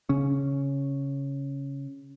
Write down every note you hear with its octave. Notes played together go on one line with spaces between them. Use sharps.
C#3 C#4